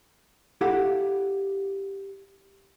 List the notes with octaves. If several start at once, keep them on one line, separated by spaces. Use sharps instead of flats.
E4 G4 A4 F5 F#5